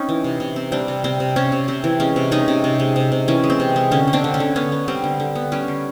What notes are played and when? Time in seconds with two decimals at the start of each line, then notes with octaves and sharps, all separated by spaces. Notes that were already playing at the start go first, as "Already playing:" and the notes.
Already playing: C4 C#4 D#4
0.09 E3
0.24 C3
0.40 C3
0.56 C4
0.72 G3 C4 D4
0.88 C3
1.04 C3 C4
1.20 C3
1.36 C3 C#4
1.52 C3
1.68 C3 C4
1.84 E3
2.00 G#3 C#4
2.16 C3
2.31 G#3 C#4 D#4
2.48 C3
2.64 C3
2.80 G#3
2.96 C3
3.12 C3
3.28 E3 C#4
3.44 G#3
3.50 C4
3.60 C3
3.76 G#3
3.91 D3 C#4
4.07 D3
4.13 C4 D4
4.24 D3
4.34 C#4
4.40 D3
4.56 B3 C#4
4.72 B3
4.88 G3 C4
5.04 D3
5.20 D3
5.35 B3
5.52 G3 C#4
5.68 D3